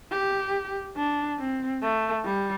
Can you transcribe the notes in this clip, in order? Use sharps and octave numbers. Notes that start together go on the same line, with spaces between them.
G4
D4
C4
A3
G3